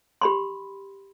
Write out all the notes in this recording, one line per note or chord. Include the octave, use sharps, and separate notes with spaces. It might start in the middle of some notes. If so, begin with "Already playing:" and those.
G4 B5 C6